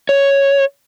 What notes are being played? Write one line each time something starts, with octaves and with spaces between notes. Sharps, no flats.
C#5